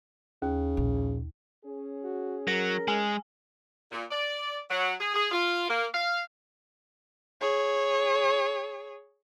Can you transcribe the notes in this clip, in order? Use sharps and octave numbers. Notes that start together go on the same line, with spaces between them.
D#2 C#3
A#1
C#4 G#4
F#4
F#3 A#4 A#6
G#3 G#5
A#2
D5
F#3
G#4
G#4
F4
A#3
F5
G#4 C#5